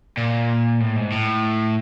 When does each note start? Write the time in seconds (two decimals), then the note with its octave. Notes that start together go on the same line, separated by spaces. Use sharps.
0.17 A#2
0.80 A2
0.96 G#2
1.12 A2